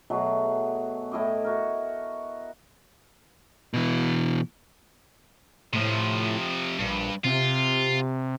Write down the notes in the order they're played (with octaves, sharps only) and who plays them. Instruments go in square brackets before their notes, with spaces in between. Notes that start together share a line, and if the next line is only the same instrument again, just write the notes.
[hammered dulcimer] B2 F#3 A3 G#4
A2 E4 D#5 D6
F#4 A#4
[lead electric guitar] B2 E3
[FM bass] A2 [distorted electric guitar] C3 F3
[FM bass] A#1 [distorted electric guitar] G2
[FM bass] C3 [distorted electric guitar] F4